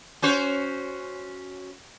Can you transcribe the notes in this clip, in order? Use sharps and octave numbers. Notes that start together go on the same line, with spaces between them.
C#4 F#4 C5